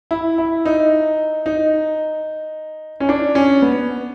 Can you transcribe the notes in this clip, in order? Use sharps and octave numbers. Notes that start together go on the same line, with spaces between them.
E4
E4
D#4
D#4
C#4
D4
C#4
B3